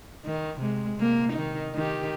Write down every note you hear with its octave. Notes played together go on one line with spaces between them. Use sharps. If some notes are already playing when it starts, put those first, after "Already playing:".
D#3
C3 G#3
C3 A#3
D#3 D#4
D#3 G4